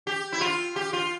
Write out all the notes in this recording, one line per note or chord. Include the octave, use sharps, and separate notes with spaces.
G4
E4
F4
G4
F4